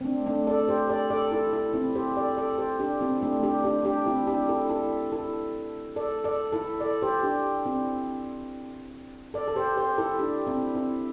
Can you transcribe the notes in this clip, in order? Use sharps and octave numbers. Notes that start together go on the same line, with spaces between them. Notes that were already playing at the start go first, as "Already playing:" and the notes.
C4
A3 D4
A3 D4
A4 D5
G4 C5
A4 D5
A4 D5
E4 A4
E4 A4
C4 E4
G4 C5
A4 D5
A4 D5
G4 C5
D4 G4
C4 E4
A3 D4
D4 G4
D4 G4
D4 G4
C4 E4
D4 G4
E4 A4
E4 A4
E4 A4
A4 D5
A4 D5
E4 A4
A4 D5
G4 C5
D4 G4
C4 E4
A4 D5
A4
G4 C5
G4 C5
E4 A4
D4 G4
C4 E4
C4 E4